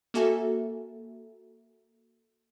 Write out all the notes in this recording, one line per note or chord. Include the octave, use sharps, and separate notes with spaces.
A#3 F#4 A4 E5 G#5